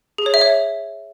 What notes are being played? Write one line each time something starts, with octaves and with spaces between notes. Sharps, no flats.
G#4
C#5
E5
C#5